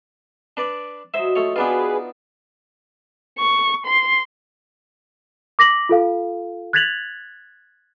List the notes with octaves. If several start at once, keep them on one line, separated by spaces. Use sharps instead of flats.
D4 B4 D5
F#3 E4 C5 D#5 E5
F3 A3 C#5
B3 D4 D#4 F4 F#4 G#4 B4
C#6
C6
D6 A#6 B6 F#7
F4 A4 F5
F#6 G#6 A6 B6 F7 F#7